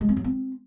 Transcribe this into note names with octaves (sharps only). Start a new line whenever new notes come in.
G#3
C4
F#3
C4